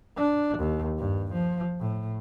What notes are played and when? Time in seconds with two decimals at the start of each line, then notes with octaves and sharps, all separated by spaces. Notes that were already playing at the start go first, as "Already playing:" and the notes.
0.17 D4
0.58 D#2
0.98 G2
1.33 F3
1.80 A2